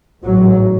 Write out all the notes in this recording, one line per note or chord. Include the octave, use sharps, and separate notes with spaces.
A1 G#2 F#3